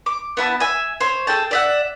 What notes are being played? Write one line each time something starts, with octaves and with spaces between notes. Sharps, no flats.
D6
B3 E4 A5
E5 G#5
C5 C#5
G#4 A4 G5 A5
D5 E5 F#5